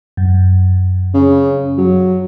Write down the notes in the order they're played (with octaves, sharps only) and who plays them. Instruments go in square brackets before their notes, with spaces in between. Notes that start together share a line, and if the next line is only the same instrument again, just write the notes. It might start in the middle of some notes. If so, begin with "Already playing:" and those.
[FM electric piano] F#2
[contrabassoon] C#3
F#3